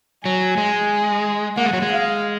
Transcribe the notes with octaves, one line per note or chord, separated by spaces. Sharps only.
F#3 G#5
G#3
A#3 F#5
G#3
F#3
G#3
F5